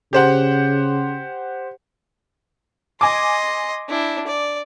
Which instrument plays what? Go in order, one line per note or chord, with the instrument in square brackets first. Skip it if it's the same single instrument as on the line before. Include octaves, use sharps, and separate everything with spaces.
[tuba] C#3 [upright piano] G4 C5 F#5
[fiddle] D#5 C6 [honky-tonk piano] G#5 D6
[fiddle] D4 E4
D5